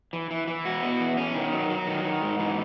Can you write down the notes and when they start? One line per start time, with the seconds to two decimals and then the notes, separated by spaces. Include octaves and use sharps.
0.13 E3
0.31 E3
0.48 E3
0.65 F#4
0.83 B3
1.00 E3
1.17 C#4
1.35 D#3
1.52 F#3
1.70 F#3
1.87 D#3
2.04 D#3
2.22 G#2
2.39 E3